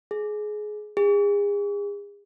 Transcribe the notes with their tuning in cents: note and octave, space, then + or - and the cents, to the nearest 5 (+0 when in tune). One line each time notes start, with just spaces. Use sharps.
G#4 +20
G#4 -35